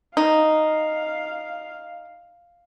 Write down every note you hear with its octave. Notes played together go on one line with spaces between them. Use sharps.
D#4 F5